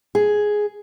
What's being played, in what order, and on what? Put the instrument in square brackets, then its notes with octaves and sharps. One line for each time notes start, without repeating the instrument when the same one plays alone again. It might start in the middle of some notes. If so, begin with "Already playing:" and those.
[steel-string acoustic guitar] G#4